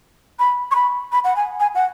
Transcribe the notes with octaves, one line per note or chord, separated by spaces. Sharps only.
B5
C#6
B5
B5
F#5
G#5
G#5
F#5